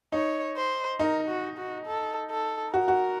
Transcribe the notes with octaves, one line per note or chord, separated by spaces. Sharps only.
D#4 C#5
C5
D#4 A#4
F#4
F#4
A4
A4
F#4 A#4
F#4